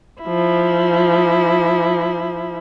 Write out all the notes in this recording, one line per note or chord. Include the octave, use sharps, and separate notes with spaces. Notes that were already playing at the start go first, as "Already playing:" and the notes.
F3 E4